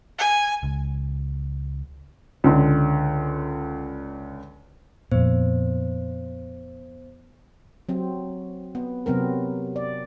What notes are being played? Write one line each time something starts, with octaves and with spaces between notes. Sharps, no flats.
G#5
C#2
C#2 D3
F2 A#2 B3 C5
F#3 C4
B3
C3 F#3 B3 C4 A#4
D5